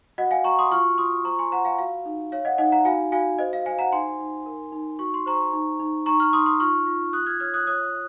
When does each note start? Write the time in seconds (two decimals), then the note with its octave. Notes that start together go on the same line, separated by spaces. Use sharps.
0.18 F#4 D#5 F#5
0.31 F5 G#5
0.44 F#4 A#5 C#6
0.59 C6 D#6
0.71 F4 C#6 F6
0.98 F4 C6 D#6
1.24 C5 A#5 C#6
1.39 G#5 C6
1.52 C5 F#5 A#5
1.65 F5 G#5
1.78 F#4 F5
2.05 D#4
2.32 C#5 F5
2.45 D#5 F#5
2.58 D#4 D#5 F#5
2.72 F#5 A#5
2.85 F#4 F5 G#5
3.12 F#4 F5 G#5
3.38 C5 D#5
3.53 F5
3.66 C5 F5 G#5
3.79 F#5 A#5
3.92 D#4 G#5 C6
4.20 D#4
4.46 A#4
4.72 D#4
4.99 F#4 C#6
5.14 C6
5.26 C5 A#5 C#6
5.53 D#4
5.79 D#4
6.06 D#4 A#5 C#6
6.20 C#6 F6
6.33 D#4 C6 D#6
6.46 C6 D#6
6.60 F4 C#6 F6
6.87 F4
7.13 F4 D#6 F#6
7.26 F6 G#6
7.40 C#5 F6 G#6
7.54 D#6 F#6
7.67 C#5 D#6 F#6